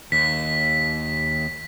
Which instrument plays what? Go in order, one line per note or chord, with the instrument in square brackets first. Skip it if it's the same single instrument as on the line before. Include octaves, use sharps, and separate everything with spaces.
[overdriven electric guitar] D#2 [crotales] B6